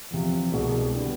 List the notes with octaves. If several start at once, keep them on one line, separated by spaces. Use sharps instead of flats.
E2 C3 F3
C2 B2 G#3
D3 G3 B3